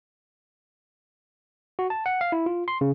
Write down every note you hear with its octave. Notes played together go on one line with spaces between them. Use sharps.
F#4
A5
F#5
F5
E4
F4
C6
C#3